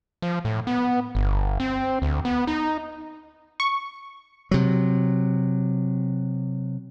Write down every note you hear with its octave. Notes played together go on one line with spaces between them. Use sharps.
F3
A2
B3
G1
C4
D2
B3
D#4
C#6
C3 F#3